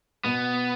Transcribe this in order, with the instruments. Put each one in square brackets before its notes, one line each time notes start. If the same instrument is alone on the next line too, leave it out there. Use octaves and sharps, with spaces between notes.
[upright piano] B2 [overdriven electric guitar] B3